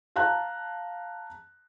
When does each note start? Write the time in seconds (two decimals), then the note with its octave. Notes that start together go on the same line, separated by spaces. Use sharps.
0.16 F5 A5 A#5 F#6